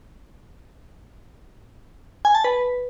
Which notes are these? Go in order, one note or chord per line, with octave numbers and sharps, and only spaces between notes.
G#5
A5
B4